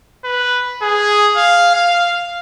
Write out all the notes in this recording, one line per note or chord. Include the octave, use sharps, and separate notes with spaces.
B4
G#4
F5
F5